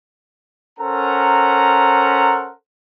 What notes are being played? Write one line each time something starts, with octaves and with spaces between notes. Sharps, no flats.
C#4 A4 A#4 C5 F#5 A#5